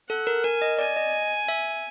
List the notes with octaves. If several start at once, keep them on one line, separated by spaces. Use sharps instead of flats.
A4 F#5
A#4
A#4 G#5
D#5
D5 G#5
D#5
E5